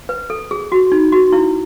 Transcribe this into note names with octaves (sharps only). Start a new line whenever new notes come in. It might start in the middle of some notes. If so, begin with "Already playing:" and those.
B4
A4
G#4
F#4
D#4
F#4
E4